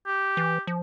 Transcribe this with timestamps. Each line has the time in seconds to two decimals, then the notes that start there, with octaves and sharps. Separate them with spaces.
0.07 G4
0.37 E3
0.67 F3